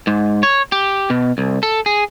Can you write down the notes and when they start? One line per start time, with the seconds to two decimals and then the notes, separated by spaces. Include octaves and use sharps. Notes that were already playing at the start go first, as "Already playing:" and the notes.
0.07 G#2
0.43 C#5
0.72 G4
1.10 B2
1.38 C2
1.63 A4
1.86 G#4